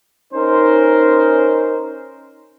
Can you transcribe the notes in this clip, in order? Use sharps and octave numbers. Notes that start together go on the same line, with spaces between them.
C#4 D#4 A#4 C5